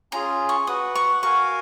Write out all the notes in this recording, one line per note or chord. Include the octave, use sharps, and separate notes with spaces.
C#4 F4 G#4 A#5
C#6
F#4 B4 F#5 D#6
C#6
F#4 A#4 F5 G#5 C#6